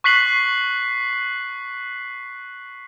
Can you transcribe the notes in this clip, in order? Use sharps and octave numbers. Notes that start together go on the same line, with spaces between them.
C#6 F#6 B6 C7 F#7